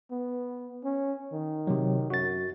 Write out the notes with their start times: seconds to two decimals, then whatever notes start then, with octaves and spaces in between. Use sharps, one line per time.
0.11 B3
0.85 C#4
1.32 D#3
1.67 C3 F#3
2.10 F#2 F#4 A6